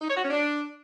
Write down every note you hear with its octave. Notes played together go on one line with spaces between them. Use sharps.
D#4
C#5
F#4
C#4
D4